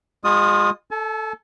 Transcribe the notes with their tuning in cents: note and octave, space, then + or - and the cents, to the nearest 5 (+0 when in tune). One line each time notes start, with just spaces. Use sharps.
G#3 -25 F4 +30 D#6 +0
A4 +0 A5 -45